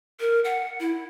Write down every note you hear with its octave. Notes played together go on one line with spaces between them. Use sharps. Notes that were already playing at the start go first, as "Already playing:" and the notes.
A#4
F#5
E4